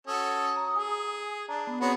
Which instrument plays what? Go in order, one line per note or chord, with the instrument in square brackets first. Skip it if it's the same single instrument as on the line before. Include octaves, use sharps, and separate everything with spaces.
[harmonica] C#4 F#4 A4 [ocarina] D#6
[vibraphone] A#5
[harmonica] G#4 [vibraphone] G#5
[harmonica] D4 [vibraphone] A5 [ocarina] A#5
[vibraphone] B3
[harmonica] B3 F#4 G#4 [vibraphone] C4 B5 [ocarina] C#5